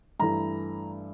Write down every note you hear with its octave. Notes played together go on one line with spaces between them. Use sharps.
G2 E3 A3 E4 A#5